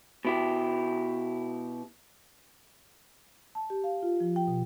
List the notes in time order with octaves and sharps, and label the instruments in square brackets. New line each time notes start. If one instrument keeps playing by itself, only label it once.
[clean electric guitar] B2 E4 G4
[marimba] A5
G4
F5
F4
F3
G5
B2